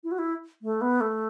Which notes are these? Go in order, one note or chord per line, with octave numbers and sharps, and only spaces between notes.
E4
F#4
E4
A3
B3
A3